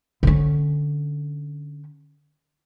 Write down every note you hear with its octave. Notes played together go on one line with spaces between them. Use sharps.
D3 C#4